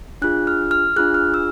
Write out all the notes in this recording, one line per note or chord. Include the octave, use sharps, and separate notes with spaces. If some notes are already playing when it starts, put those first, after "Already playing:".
D4 F4 G#4 F#6
F6
F6
D4 F4 G#4 F#6
F6
E6